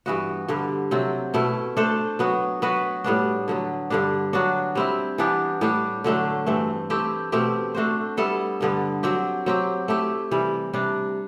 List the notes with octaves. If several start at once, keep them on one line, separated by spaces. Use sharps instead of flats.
G2 E3 B3 F#4
G2 D3 G3
C3 F#3 C4
B2 A3 E4
A3 D4 A4 C5
F#3 B3 F#4
F#3 B3 F#4 B4
A2 G3 B3 D4
D3 F#3 B3
G2 D3 G3 D4
F#3 B3 D4 F#4
G3 C4 E4
E3 B3 D4 G4
A2 G3 D4 G4
D3 F#3 A3 D4
G2 E3 A3 C4
A3 C4 E4 G4
B2 A3 C4 G4
A3 D4 F#4 C5
G3 B3 E4 A4
G2 D3 G3 B3
F#3 C4 G4
F#3 C4 G4
A3 E4 G4
C3 E3 G3
C3 G3 D4